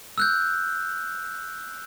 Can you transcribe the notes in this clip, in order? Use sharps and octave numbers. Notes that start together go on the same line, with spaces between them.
E6 F#6 G6